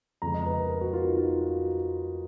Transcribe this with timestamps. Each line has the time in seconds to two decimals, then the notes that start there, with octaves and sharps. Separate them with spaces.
0.22 F2 C#3 G#3 A#5
0.34 D#5
0.45 B4
0.58 A#4
0.70 A#4
0.81 F#4
0.93 F4
1.05 D#4
1.17 F4
1.41 F#4